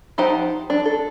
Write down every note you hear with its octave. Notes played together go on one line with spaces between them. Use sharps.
F3 D#4 G4 C5 F#5
D4
A4